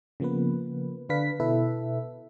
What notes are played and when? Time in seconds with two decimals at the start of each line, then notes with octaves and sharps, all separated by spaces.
0.20 C#3 F3 A#3 B3 B4
1.09 D3 D4 B4 F5 B6
1.40 B2 E4 A4 B4 E5